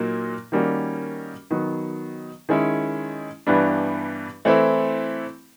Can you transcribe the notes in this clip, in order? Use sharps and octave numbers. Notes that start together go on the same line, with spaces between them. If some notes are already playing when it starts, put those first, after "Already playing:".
Already playing: A#2 F#3 A#3 D#4
D#3 G3 A#3 C#4 F#4
D#3 F#3 B3
D#3 G#3 C#4 E4
G2 E3 G3 B3 D4
E3 A3 C4 E4